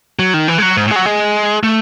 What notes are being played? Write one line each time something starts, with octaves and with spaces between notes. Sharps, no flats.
F#3
D#3
E3
G#3
F#3
G#2
A2
G#3
F#3
G#3
A3